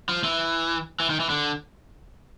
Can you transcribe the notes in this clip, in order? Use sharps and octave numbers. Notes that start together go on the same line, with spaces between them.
F3
E3
E3
D#3
E3
D3